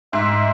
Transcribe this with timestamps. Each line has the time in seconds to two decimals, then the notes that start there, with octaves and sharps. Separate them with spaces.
0.13 G#2 E5